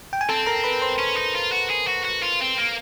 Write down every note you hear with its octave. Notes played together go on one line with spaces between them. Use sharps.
G5
G#5
C4 A4 A5
A#4 A#5
B4 B5
C5 C6
C#4
D#4
F4
F#4
G#4
F#4
F#4
F4
C4
A#3